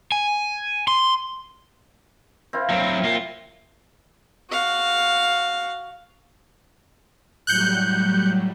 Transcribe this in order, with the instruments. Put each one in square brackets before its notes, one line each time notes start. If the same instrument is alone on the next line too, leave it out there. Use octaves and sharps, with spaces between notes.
[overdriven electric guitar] G#5
C6
[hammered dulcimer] C4 E4 F5
[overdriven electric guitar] F#3 C4 [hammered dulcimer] E5
[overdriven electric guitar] A#3 F4
[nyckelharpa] F#4 F5
[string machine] A2 F#3 G3 [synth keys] F#6 G6 C#7